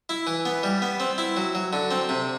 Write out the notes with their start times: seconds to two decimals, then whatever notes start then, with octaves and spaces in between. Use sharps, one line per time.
0.09 E4
0.27 E3
0.45 B3
0.63 G3
0.82 B3
1.00 C4
1.18 E4
1.37 F#3
1.55 F#3
1.73 D3
1.91 C4
2.09 C3